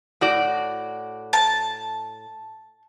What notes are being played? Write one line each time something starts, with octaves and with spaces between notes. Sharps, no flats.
A2 F#4 D5
A5